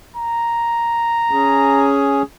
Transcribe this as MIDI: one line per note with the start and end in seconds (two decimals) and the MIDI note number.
0.17 1.91 82
1.31 2.22 61
1.31 2.22 68